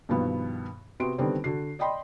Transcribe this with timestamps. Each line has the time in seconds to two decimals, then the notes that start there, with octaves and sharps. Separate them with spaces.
0.09 G2 B2 D#3 F3 B3
1.00 C3 B3 F#4 C6 D7
1.18 D3 D#3 G3 B3 C4
1.44 D3 F#4 C7
1.79 D5 D#5 G5 B5 C6